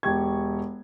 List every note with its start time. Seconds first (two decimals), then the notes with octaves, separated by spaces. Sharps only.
0.03 E1 G4 C#6 G#6